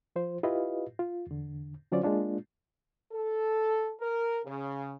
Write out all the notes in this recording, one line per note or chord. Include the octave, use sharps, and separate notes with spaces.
F3 F4 C5
E4 F4 G4 B4 D#5 F5
F4
E2 D3
D3 F#3 C#4 F4 C5 D5
G#3 A#3 D4 F4
A4
A#4
C#3